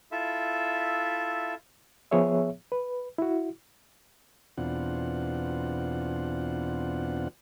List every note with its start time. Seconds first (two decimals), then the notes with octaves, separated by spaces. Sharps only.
0.12 E4 F4 A4 E5
2.11 F3 B3 G#4 C#5 E5
2.72 B4
3.18 E4 F#4
4.58 E2 B2 C4 D4 F4 F#5